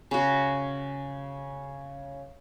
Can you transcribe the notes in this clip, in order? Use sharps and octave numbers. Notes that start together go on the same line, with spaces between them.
C#3 F#4